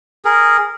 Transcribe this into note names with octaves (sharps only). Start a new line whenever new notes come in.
G#4 A#4